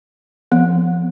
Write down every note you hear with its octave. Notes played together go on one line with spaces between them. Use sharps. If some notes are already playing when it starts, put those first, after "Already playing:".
F3 B3